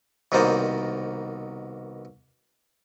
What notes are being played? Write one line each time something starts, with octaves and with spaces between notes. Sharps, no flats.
C2 B2 D#3 A#3 C5 D5